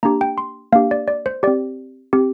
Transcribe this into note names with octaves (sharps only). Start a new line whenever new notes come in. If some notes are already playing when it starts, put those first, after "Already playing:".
A#3 D4 G4 A#5
G5
C6
A#3 D4 G4 F5
D5
D5
C5
C4 G4 D5
C4 G4